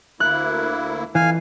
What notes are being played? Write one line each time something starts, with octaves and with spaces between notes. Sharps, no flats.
D2 A#3 E4 F#6
F2 E3 F5 G#5